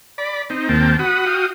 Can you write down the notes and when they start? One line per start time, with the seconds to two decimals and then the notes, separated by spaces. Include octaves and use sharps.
0.18 D5 B5
0.50 C4 D#4
0.69 D#2 A#3 C4 G5 A5
0.99 F#4 F#5 B5 D#6
1.26 F#4 F5 G5 D#6